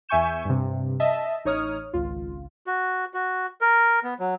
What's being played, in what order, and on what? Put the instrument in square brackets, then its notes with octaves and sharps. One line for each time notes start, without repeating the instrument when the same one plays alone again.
[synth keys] E2 E5 G#5 C#6 G6 E7
G2 C3
D#5 E5 A5
A1 D#4 C#5 D#6 F6
G#1 C#2 F4
[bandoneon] F#4
F#4
A#4
B3
F#3